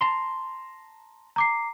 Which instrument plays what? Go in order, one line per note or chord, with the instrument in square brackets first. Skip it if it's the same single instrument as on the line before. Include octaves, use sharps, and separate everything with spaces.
[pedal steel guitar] A5 A#5 C6
[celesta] A#5 D6 C7